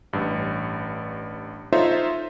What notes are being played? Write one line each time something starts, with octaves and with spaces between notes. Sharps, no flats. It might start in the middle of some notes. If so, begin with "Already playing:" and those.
A1 G2
D#4 F4 A4 C5 C#5 E5